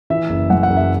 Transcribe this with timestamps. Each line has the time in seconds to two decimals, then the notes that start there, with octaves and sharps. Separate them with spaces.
0.10 E3 E5
0.29 F#1
0.50 F#2 F#5
0.63 F#5
0.69 F#1
0.77 E5